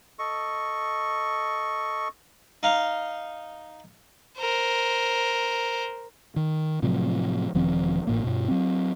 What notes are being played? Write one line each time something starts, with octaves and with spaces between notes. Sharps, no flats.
A4 D#5 C#6
D#4 F5
A#4 C5
D#3
A2 C3 F3 F#3
E1 D#3 F3 C4
A1 A2 A#3
G2 B2
F#3 C4